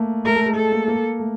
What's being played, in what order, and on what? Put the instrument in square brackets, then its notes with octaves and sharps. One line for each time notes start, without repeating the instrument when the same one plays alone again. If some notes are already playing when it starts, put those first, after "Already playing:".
Already playing: [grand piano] A3 A#3
[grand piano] A3 [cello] A#4
[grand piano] A3
G#3
[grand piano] G#3 [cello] A4
[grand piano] A#3
A#3
A3